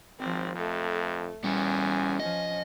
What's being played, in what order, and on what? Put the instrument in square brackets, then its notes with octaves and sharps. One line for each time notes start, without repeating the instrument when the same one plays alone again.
[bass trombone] G#1 [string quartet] F3 C4
[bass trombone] F2 [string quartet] A3
[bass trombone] E2 [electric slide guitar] G3 C#4 [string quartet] G#5
[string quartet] F3 C#4 [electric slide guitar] D#5